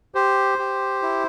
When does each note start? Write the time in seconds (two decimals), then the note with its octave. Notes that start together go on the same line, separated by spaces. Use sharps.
0.15 G4 C5
0.58 G4
1.02 E4